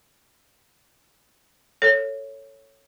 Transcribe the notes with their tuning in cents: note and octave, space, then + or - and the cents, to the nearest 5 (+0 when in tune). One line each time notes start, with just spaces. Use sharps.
A4 +15 C#5 +0